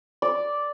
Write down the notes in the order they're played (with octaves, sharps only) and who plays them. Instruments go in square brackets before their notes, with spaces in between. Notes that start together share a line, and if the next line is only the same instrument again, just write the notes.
[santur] D5